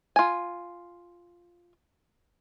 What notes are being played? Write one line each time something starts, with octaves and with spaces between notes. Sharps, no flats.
F4 G#5